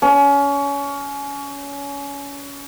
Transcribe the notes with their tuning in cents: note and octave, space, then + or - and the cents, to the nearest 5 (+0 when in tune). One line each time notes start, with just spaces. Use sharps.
C#4 +25